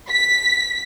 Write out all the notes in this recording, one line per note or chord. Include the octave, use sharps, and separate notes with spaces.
B6